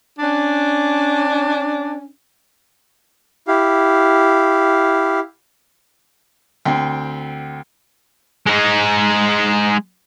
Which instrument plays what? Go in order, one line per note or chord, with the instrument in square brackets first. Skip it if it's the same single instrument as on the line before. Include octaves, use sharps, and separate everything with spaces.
[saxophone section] C#4 D4
[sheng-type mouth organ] E4 G4 F5
[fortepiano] D2 C4 G5
[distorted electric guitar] G#3 D#4